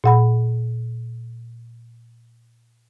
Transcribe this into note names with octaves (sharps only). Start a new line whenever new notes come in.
A#2 F#5 B5